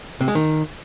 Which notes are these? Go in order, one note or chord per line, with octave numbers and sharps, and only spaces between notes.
C3
G#3
D#3